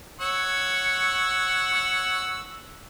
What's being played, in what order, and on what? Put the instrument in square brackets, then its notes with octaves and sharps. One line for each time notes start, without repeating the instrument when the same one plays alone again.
[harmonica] C#5 F#5 E6